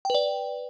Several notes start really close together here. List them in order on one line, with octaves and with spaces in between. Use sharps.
G5 B4 D5